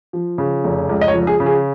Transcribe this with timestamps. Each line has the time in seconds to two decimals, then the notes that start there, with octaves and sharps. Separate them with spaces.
0.13 F3
0.38 C#3
0.64 F1
0.89 C#2
1.01 D#5
1.08 C#5
1.14 F3
1.27 G#4
1.40 C#3
1.46 G#4